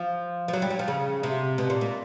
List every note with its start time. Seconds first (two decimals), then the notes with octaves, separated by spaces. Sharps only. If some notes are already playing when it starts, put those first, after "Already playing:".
Already playing: F3
0.48 F3
0.53 F#3
0.62 G3
0.70 F#3
0.79 F3
0.88 C#3
1.23 C3
1.58 B2
1.70 A#2
1.81 A#2